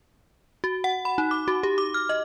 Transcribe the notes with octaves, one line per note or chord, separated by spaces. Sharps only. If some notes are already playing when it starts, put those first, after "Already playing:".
F#4
F#5
B5
D#4
D6
F#4
G4
D6
F6
D#5